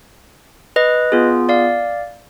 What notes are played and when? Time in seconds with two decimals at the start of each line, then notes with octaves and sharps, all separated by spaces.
0.76 B4 D#5
1.12 B3 F4 G#4
1.49 D5 F5